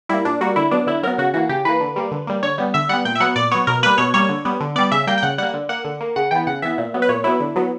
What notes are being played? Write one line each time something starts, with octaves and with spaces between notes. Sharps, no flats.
G3 A#3 E4
A#2 D4
G3 A#3 F#4
D3 E4
F#3 B3 D4
D3 E4
F#3 B3 A#4
C#3 F#4
E3 A#3 F#4
C#3 G4
E3 A#3 B4
D3
G3 A#3
D3
G3 A#3
D3 C#5
G3 B3
D3 E5
G3 B3 F#5
A#2 G5
E5
F#3 B3 F#5
A#2 D5
F#3 B3 C#5
B2 A#4
G3 A#3 B4
B2 C#5
G3 A#3 C#5
D3
G3 B3
D3
G3 B3 D5
C#3 E5
G3 A#3 G5
G5
C#3 F#5
G3 A#3 F#5
D3
A#3 F#5
D3
A#3
C#3 F#5
E3 B3 G5
C#3 F#5
E3 B3 E5
A#2
F#3 B3
B4
A#2 C#5
F#3 B3 E4
D3
F#3 B3